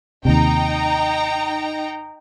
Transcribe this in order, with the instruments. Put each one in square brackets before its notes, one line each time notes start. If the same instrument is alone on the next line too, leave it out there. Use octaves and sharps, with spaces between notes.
[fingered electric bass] D#2 C3 [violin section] D#4 G5 A#5